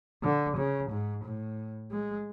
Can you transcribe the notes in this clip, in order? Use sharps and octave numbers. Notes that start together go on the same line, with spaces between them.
D3
C#3
G#2
A2
G#3